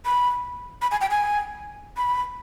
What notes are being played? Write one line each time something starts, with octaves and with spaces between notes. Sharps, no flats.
B5
B5
G#5
G5
G#5
B5